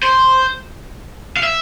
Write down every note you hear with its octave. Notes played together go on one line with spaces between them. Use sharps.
C5
F5
E5